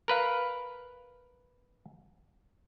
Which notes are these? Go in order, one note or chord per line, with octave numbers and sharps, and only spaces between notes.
A#4 B4 F5